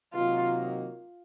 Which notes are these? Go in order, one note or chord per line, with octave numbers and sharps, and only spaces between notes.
C3 D#3 F#3 A#3 D#4 F4